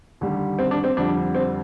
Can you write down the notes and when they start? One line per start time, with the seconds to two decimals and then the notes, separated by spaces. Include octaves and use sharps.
0.21 D#2 D3 G3
0.59 C4
0.71 D4
0.84 C4
0.97 F2 D3 G3 D4
1.35 C4